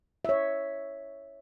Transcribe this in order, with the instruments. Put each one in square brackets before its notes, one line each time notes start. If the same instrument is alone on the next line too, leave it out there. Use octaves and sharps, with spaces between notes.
[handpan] C#5 E5